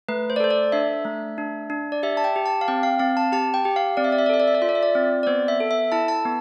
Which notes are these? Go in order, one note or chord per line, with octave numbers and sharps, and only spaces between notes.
A3 B4
C5
D5
A4 C5
D5
D4 E5
A3
D4
D4
D5
G4 E5
A5
G5
G4
A5
F5
C4 G5
F5
C4 F5
A5
G4 A5
G5
G4
F5
C4 D5
E5
D5
E5
D5
A4 E5
D5
E5
D5
F4 E5
D5
E5
D5
C4
D5
B3 C5
E5
A4
E5
E4 A5
A5
B3